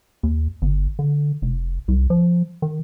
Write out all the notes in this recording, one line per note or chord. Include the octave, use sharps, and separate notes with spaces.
D#2
G1
D3
F1
C2
F3
D#3